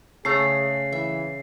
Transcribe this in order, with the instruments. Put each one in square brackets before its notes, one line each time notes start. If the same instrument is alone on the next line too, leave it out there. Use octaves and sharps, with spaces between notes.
[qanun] C#3 A5 A#5 [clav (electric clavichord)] A3 [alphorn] G#4 [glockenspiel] C7
[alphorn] E3 [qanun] E5